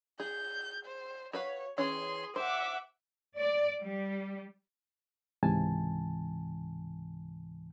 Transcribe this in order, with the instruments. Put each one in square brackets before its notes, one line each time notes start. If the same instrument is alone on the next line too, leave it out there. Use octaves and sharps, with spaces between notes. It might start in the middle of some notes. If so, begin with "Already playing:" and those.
[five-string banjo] G#4 [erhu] G6
[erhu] C5
[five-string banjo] F#4 B4 F5 [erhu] C#5
[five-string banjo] E3 C#4 C#5 [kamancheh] G#4 [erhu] C6
[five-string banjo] C5 [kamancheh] E5 F#5 [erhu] D6
[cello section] D5
G3
[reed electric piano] C#2 G#2 C3 E3 G#5 A5